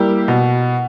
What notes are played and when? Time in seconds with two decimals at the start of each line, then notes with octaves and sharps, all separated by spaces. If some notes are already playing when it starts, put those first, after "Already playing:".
Already playing: G3 A#3 E4 G4
0.28 B2